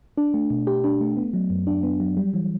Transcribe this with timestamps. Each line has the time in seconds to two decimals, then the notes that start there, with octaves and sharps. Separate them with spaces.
0.17 D4
0.34 A3
0.50 B2
0.67 G4
0.84 D4
1.01 A3
1.17 B3
1.34 F#3
1.50 F#2
1.67 D4
1.83 B3
2.00 F#3
2.17 G3
2.34 E3